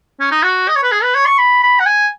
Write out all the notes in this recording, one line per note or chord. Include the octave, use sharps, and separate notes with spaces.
C#4
D#4
F#4
D#5
C#5
B4
G#4
B4
C#5
C#6
B5
B5
F#5
G#5